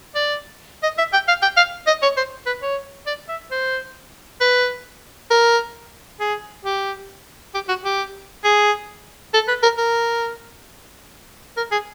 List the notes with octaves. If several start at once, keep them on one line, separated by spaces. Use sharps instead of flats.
D5
D#5
E5
G5
F5
G5
F5
D#5
C#5
C5
B4
C#5
D5
E5
C5
B4
A#4
G#4
G4
G4
F#4
G4
G#4
A4
B4
A#4
A#4
A#4
G#4